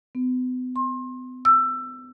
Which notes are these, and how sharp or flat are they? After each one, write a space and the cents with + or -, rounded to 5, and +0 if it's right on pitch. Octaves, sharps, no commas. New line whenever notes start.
B3 +40
C6 +30
E6 +20